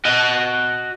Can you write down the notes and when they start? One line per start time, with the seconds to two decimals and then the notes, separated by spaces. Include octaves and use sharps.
0.05 F#4 D#5